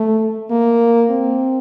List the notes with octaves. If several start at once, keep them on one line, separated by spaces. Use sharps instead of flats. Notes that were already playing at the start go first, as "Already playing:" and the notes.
Already playing: A3
A#3
C4